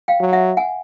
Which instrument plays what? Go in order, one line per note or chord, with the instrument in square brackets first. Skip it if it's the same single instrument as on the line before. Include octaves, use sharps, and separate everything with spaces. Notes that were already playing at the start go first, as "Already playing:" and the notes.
[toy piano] F5 G5
[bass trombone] F#3
[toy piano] E5 F#5
F#5 G#5